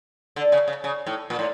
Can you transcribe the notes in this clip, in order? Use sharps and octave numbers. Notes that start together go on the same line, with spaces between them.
D3
C#3
C#3
C#3
A2
A#2
A2